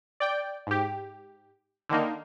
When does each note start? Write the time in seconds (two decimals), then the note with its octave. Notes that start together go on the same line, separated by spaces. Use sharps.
0.20 D5 G5
0.67 G#2 G4
1.89 D3 D#3 A#3 D#4